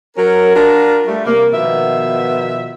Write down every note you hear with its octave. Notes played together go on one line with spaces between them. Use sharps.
F#3 C#4 A#4
D4 F4 F#4 A#4
G3 A3
C3 G3 A#3
B2 D#3 F3 B3 E5